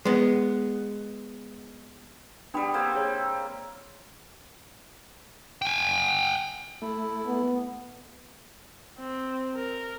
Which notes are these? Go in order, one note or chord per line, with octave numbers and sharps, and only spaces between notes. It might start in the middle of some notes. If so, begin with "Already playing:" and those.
G#3 B3
G3 B3 D4 G5 B5
A#3 C4
G#4 C#5
G5 G#5
A3 E4
B3
C4
A#4